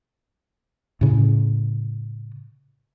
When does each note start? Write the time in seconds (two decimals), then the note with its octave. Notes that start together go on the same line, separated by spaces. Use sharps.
1.01 A2 C#3